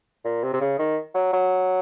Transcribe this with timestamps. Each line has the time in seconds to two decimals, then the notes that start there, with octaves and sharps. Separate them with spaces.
0.25 A#2
0.43 C3
0.53 C3
0.61 C#3
0.79 D#3
1.15 F#3
1.33 F#3